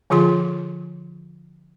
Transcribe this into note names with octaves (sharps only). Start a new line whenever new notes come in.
D3 F3 F4 G#4 C6